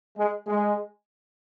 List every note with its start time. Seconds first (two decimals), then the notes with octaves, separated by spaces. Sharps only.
0.18 G#3
0.47 G#3